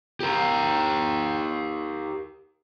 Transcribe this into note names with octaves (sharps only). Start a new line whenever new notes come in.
G4 A#4